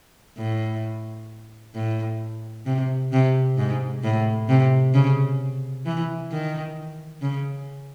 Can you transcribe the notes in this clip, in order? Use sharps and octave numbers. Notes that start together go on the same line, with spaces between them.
A2
A2
C3
C3
G#2
A2
C3
C#3
E3
D#3
C#3